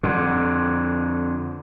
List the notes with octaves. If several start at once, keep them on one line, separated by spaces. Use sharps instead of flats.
F2 D3